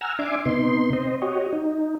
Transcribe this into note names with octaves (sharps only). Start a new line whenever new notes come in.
F#5 G#5 A#5 E6 F6
D4 E5 G#5 C6 D6
C3 B3 D#4 C6
C4 C5 D#5
F#4 G4 C#5 D#5
D#4